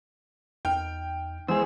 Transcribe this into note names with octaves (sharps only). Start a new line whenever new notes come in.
E2 D#4 G5 F6
E2 G#3 G#4 C5 E6